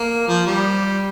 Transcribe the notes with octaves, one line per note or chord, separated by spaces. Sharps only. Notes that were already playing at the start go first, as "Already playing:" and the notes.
Already playing: A#3
F3
G3